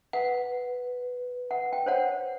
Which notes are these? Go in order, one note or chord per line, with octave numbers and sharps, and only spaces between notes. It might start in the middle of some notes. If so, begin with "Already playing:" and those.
B4 F#5
F#5
G5
C5 C#5 F#5